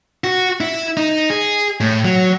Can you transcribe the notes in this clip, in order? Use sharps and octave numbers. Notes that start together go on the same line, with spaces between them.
F#4
E4
D#4
G#4
A2
F#3